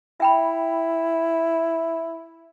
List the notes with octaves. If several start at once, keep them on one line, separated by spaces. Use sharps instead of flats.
E4 E5 G5 B5